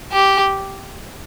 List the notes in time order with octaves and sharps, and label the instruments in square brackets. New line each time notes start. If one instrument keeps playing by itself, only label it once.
[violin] G4